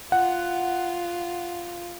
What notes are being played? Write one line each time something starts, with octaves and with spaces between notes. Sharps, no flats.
F4 F#5